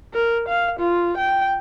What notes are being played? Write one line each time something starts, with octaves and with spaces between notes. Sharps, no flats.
A#4
F5
F4
G5